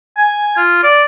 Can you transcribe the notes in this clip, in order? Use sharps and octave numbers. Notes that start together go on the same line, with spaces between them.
G#5
F4
D5